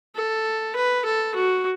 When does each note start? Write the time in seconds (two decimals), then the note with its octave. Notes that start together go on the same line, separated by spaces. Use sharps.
0.16 A4
0.76 B4
1.05 A4
1.35 F#4